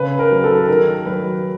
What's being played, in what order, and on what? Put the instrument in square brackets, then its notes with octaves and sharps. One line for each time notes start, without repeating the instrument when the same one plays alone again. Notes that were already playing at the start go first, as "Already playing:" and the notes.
Already playing: [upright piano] C#3 B4
A#4
F#3
A4
D#3 A#4
F#3 B4